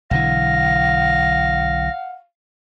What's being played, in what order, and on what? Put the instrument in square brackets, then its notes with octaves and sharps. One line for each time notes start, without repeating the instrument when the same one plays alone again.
[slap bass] B1 D3 E3 [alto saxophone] F5 [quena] F#5 [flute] A#6